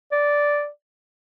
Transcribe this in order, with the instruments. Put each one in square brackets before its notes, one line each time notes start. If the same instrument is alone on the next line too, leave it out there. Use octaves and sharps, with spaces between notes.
[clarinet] D5